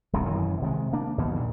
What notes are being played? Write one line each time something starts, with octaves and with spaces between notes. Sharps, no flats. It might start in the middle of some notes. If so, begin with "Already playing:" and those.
D#1 C2 F2 C3
F#2 D#3 E3
C3 D#3 F#3 G#3
A#3 D4
D#2 B2 D#3 F#3
A#2